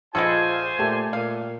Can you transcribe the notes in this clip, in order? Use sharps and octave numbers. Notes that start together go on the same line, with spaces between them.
A#1 G#3 B3 F4 A4 C5 G#5
A#2 A3 G4 A5
A#2 F5